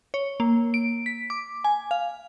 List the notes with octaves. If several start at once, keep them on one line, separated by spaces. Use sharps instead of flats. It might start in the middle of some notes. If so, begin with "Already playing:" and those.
C#5
A#3
D7
B6
D6
G#5
F5